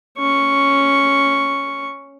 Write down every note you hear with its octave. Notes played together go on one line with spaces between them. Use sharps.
C#4 C#6